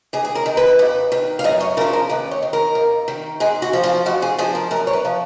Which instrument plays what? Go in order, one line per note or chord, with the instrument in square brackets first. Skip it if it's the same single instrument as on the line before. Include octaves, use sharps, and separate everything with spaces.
[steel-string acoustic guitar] D#2 G#4
G#4
A#4
D#3
B4
D#2
D#3
F5
F#2 D#5
C#5
C#3 A#4
F3
A#4
D#2 B4
C#5
D#3
A#4
D#2
D#3
G#2 G#4
F#4
F3
F4
F2 F#4
G#4
F3 G#4
A#4
F#2 A#4
C#5
B4
F3